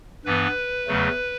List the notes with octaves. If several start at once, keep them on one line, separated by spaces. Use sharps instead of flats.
G2 E3 B3 B4
E2 C#3 F#3 A3